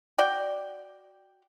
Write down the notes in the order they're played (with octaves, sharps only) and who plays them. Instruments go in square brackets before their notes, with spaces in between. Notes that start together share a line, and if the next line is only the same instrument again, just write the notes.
[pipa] F#4 D5 G5